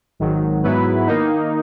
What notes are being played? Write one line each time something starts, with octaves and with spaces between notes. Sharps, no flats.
G#1 G#2 D#3 F#3
G#2 F#3 B3 E4 B4
D#3 A#3 D#4